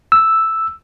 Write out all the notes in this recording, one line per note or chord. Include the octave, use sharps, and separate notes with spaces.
E6